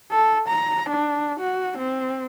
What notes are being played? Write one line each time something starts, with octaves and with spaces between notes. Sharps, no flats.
A4
A#5
D4
F#4
C4